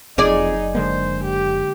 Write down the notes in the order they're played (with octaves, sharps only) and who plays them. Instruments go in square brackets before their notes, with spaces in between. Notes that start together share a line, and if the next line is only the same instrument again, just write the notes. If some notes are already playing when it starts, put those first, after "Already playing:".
[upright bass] F#1 F#3 [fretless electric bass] F2 [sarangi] D#4 [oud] G#4 D5
[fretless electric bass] D3 G#3 A#3 [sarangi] C5
[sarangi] G4